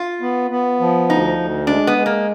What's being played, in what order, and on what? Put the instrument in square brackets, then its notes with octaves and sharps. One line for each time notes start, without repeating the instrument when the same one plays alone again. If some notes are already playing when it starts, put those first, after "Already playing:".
Already playing: [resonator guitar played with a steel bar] F4
[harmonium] B3
B3
F3
[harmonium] D2 [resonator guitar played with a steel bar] D#4
[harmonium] D2
[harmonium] G#3 [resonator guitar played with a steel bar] D4
[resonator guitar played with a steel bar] B3
[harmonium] G#3
[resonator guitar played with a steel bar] A#3